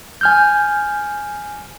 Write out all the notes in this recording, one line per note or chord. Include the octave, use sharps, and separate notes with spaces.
G#5 F6 G6